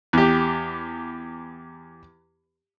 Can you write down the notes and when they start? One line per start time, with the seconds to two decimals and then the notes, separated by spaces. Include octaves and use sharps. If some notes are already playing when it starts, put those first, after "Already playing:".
0.13 E2 G4